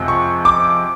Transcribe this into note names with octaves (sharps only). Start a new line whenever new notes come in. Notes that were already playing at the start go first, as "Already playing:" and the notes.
Already playing: F2 C3 F3 G#3
C#6
D6